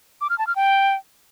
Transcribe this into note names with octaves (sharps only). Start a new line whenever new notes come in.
D6
F6
A5
F6
G5